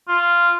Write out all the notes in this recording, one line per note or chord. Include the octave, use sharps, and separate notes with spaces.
F4